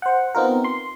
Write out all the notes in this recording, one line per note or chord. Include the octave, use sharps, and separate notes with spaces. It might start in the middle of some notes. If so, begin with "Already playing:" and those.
C5 F#5
B3 C4 D#4 F4 A#4
C6